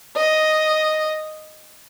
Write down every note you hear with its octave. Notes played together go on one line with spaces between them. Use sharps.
D#5